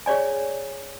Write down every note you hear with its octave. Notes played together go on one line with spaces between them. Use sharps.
G#4 C#5 D5 G#5